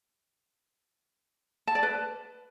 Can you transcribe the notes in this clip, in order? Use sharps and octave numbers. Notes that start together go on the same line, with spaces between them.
A5
D5
B4